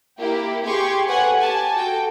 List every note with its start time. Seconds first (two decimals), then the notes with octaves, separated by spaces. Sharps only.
0.19 A#3 E4 G4
0.64 G4 G#4 G#5 C6 C#6
1.08 A4 B4 C#5 F#5 G#5
1.39 G4 G#5 A5
1.77 F#4 A4 G5